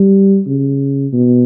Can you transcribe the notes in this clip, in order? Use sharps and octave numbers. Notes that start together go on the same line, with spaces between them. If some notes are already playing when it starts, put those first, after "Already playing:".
Already playing: G3
C#3
B2